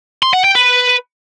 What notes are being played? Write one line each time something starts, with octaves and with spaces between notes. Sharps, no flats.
C6
F#5
G5
B4